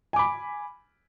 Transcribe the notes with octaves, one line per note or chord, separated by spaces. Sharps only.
G#5 B5 D6